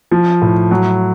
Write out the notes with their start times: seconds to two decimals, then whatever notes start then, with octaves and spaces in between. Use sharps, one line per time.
0.11 F3
0.42 A2
0.71 F#3